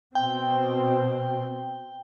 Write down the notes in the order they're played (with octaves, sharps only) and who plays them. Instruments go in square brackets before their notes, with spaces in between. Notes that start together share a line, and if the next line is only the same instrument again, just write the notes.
[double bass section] B2 C4 [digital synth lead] G5